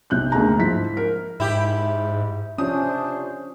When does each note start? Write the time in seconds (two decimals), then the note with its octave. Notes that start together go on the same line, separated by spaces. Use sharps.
0.10 B1 C3 F#6 G6
0.32 D2 G#3 A#3 A#5
0.58 G#2 F3 E4 B6
0.97 A#4
1.40 G#2 E4 G4
2.58 C3 F3 C#4 D4 C5 D#6